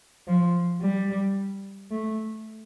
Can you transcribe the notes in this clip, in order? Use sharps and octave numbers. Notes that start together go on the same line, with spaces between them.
F3
G3
A3